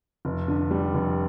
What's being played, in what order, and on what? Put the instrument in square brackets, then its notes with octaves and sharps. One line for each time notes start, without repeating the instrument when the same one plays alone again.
[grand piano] F1
D3
G3
F1